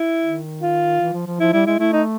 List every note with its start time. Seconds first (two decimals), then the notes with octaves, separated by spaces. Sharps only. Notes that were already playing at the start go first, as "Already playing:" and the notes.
Already playing: E4
0.23 D#3
0.62 F4
1.00 E3
1.13 F3
1.27 F3
1.40 F3 E4
1.53 G3 E4
1.66 G#3 E4
1.79 A3 E4
1.93 D#4